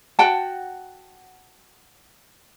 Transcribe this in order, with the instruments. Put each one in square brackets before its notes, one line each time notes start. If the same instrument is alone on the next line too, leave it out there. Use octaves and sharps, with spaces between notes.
[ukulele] F#4 F#5 G5 A5